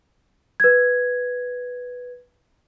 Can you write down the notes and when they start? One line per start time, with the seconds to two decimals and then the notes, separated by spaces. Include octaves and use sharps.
0.60 B4 G#6